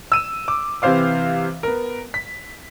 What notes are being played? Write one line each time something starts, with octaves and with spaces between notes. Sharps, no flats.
E6 D#7 E7
D6
C3 E3 C4 C5 F5 D6
B3 A#4
B6